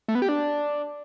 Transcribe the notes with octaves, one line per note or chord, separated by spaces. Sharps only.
A3
B3
G4
D4